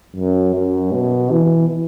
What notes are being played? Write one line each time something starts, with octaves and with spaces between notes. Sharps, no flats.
F#2
F#2
B2
E3